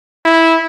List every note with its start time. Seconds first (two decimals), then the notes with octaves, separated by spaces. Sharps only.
0.25 E4